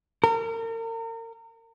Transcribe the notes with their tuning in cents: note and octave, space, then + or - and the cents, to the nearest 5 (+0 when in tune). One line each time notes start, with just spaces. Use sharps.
A#4 -35